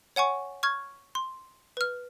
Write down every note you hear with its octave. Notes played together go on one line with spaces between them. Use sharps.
C#5 F#5 G#5 C#6
C#6 F6 G#6
C6
B4 F6